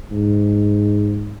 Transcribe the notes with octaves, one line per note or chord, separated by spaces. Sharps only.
G#2